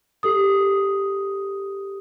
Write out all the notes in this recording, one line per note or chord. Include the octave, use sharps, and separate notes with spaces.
G4 A4 D#6